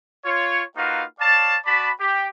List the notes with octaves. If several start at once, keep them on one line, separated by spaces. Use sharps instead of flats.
F4 C#5
A#3 D#4 F4 F#4 B4 F5
C#5 D5 F5 A5
F#4 D5 A5 B5
G4